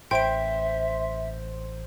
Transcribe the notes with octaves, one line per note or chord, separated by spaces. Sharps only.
A1 C5 E5 G5 D7